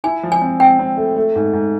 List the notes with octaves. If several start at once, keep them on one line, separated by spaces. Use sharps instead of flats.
E4 G#5
F3
G#5
C4
C4 G5
C4
A3
A3
G#2
G#2